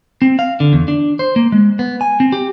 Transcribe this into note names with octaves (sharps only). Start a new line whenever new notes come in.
C4
F5
D3
E2
D4
C5
A#3
G#3
B3
G#5
C4
G4